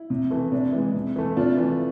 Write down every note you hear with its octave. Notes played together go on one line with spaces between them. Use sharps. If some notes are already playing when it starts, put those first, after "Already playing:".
Already playing: E4
C3
E3 A3
C3 D4
E3 G#3
C3
E3 A3
C3 D4 F4
E3 A3